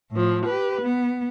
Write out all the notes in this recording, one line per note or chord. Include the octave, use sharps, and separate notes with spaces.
A2 F3
G4 B4
B3